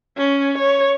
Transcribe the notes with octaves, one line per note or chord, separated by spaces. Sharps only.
C#4
C#5